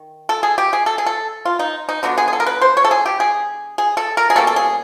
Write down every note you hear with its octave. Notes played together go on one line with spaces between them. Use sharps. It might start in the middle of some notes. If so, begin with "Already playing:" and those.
Already playing: D#3
A4
G#4
G4
G#4
A4
G#4
A4
F4
D#4
D#4
D3 F#3 B3 D4 D#4
G#4
G#4
A4
A#4
B4
C5
C#5
A4
G#4
G4
G#4
G#4
A4
A#4
G#4
B2 G3 A#3 C#4 A4
A4
G#4